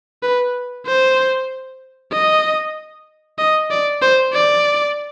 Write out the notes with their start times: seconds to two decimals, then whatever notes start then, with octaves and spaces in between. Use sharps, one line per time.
0.23 B4
0.86 C5
2.13 D#5
3.38 D#5
3.71 D5
4.02 C5
4.34 D5